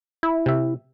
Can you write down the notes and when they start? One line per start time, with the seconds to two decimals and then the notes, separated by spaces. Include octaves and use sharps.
0.23 E4
0.46 C3 E5